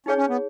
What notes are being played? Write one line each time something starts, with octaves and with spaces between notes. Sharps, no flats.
C#4 D#4 G#4 C#5
C#4
B3